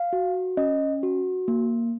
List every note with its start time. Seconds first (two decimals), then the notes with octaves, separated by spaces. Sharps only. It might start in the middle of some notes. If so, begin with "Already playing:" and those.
Already playing: F5
0.13 F#4
0.57 C#4 D#5
1.03 F#4
1.48 A#3